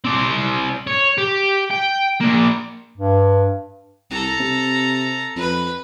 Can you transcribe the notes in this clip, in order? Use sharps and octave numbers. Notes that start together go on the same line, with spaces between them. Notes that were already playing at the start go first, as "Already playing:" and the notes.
C4 D5
C#5
G4
G5
A#3 D4
G2
C2 A4 A#5
C3
F2 B4 B5